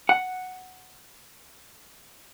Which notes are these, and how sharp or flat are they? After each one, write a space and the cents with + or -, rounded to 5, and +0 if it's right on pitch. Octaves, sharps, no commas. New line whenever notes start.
F#5 +0